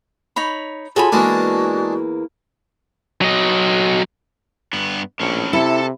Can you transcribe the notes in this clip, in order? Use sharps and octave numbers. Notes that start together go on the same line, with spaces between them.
D#4 C#5 B5
F4 F#4 G#4 A4 C#5 G#5 B5
E2 E3 G#3 A#3 D4 F#4
F#3 D#5
G2 B3
A#1 A2 C#4
C3 E4 A4 A5